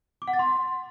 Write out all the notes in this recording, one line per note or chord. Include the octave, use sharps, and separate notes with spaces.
D6
F#5
A6
C6